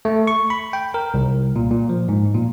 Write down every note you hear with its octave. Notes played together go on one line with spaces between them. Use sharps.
A3
C#6
B5
G5
A#4
C2
A#2
A#2
F3
G#2
A#2